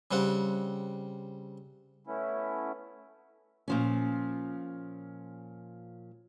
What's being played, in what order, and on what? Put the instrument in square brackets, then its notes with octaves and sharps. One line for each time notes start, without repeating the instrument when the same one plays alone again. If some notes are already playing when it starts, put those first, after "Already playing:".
[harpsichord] C#3 G3 C4 F#5
[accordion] A3 B3 C#4 E4
[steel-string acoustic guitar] A#2 F3 C#4